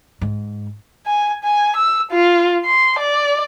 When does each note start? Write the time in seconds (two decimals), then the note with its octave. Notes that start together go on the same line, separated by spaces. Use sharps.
0.21 G#2
1.06 G#5
1.44 G#5
1.77 E6
2.11 F4
2.66 C6
2.99 D5